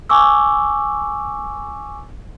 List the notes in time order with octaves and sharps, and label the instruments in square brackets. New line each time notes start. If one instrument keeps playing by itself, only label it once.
[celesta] G#5 C#6 D6 E6